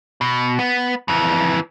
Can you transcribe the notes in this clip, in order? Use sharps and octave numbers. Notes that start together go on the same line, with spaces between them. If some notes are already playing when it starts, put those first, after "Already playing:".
B2
B3
F2 E3